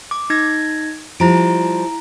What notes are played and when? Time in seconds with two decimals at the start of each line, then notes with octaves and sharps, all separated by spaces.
0.11 D6
0.30 D#4 G#6 A#6
1.20 F3 G3 E4 A#5 D7